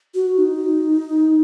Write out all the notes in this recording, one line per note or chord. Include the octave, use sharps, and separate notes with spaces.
F#4
D#4